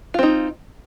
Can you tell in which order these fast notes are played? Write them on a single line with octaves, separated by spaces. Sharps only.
F4 C4 D#4